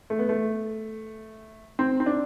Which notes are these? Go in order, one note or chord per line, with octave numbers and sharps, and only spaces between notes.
A3
B3
A3
C4
C4
D4